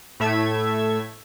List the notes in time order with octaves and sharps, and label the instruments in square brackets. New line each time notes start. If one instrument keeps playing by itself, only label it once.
[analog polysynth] A2 A3 E5 G#6